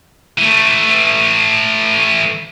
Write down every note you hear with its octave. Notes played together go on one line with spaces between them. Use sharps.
E3 A3